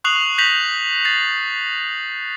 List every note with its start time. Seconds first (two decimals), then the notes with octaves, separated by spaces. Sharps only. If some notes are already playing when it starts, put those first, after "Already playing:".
0.04 C#6 D#6 F#6 C7 F7 F#7
0.38 G6 A#6 B6 F7 F#7
1.05 A6 C7